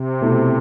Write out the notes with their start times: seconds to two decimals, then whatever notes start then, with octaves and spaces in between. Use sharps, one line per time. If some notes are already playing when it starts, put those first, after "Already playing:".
Already playing: C3
0.21 B2 A3 E4 A4